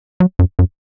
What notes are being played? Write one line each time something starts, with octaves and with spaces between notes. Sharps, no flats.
F#3
F#2
F#2